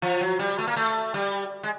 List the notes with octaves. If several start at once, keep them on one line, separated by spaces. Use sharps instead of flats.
F3
F#3
G3
A3
A#3
A3
G3
G#3